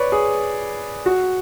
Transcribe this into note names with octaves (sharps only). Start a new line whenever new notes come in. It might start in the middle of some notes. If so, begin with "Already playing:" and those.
Already playing: B4 C#5 D5
G#4
F#4